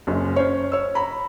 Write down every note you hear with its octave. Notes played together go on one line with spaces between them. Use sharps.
F#1 F#2
C#4 C5 C#5
C#5 E6
A#5 B5